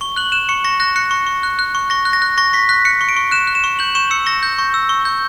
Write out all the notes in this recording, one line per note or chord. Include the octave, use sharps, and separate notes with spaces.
C#6 G7
F#6 F#7
F#6 E7
C#6 C#7
C#6 A#6
F#6 A#6
F#6 C#7
C#6
C#6
F#6
F#6
C#6
C#6 A#6
F#6
A#6
F#6
C#6 A#6
C#6 B6
F#6 B6
F#6 C#7
C#6
D7
C#6
F#6 E7
F#6
E7
C#6
G6 F#7
C#6 E7
E6 C#7
C#6 A#6
G6
C#6
E6
C#6
G6